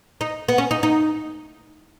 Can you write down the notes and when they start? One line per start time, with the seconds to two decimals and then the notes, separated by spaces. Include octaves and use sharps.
0.21 D#4
0.48 B3
0.58 C#4
0.71 D#4
0.83 D#4